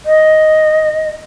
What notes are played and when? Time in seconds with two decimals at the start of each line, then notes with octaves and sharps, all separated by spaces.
0.06 D#5